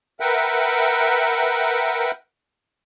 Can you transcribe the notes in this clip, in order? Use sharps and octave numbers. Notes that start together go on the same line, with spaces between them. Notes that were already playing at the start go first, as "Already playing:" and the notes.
A#4 B4 E5 F#5 G5